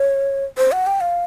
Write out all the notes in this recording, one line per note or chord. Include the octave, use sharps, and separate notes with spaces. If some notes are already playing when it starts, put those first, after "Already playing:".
Already playing: C#5
C5
F#5
G5
F5